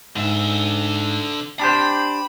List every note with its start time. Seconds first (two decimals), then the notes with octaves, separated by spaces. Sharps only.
0.16 G#2 D3 E5
1.59 D4 G4 C5 B5